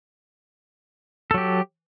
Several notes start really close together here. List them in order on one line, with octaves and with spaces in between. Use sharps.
A4 F#3 G4